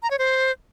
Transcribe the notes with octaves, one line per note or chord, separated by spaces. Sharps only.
A#5
C#5
C5